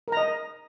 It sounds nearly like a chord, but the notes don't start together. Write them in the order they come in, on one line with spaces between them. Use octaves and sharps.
A#4 A#5 D#5